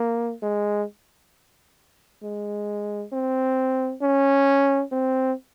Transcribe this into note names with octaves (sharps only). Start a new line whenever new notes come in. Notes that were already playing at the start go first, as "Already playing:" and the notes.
Already playing: A#3
G#3
G#3
C4
C#4
C4